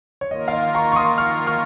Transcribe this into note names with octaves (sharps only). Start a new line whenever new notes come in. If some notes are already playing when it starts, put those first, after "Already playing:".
C#5
D#3 A#3 F4 A#4 D#5
F5
D#5
A#5 C#6
C#6
C6 D#6
C#6 F6
C#6 F6